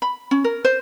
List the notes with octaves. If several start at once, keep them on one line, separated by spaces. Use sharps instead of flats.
B5
C#4
A#4
C5